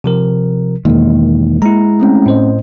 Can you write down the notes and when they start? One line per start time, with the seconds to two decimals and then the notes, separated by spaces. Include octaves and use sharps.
0.04 C3 F3 A#4
0.85 E2 B2 D#3 G#3 A#3
1.62 G#3 E4 A#5
2.00 A3 C4 C#4
2.26 A2 C5 D#5